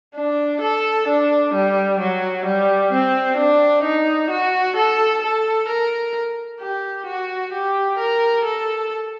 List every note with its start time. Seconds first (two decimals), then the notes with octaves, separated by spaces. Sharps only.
0.15 D4
0.61 A4
1.08 D4
1.54 G3
2.00 F#3
2.46 G3
2.92 C4
3.38 D4
3.84 D#4
4.30 F#4
4.76 A4
5.23 A4
5.68 A#4
6.60 G4
7.07 F#4
7.53 G4
7.99 A#4
8.45 A4